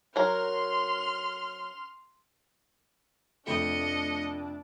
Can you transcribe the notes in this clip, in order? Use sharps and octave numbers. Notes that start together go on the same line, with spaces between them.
F#3 A#4 C6 F6
F1 F2 A3 D4 D#5 C#7